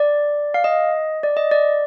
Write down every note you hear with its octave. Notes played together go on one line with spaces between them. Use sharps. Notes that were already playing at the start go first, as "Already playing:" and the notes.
Already playing: D5
F5
D#5
D5
D#5
D5